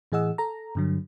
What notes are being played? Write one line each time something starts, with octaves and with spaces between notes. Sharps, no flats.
A2 E3 G#4 D#5 F#5 E6
A4 A#5
G2 D3 F#3